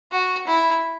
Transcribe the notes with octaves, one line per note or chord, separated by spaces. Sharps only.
F#4
E4